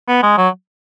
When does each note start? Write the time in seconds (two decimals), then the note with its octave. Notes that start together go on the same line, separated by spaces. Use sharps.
0.08 B3
0.23 G#3
0.38 F#3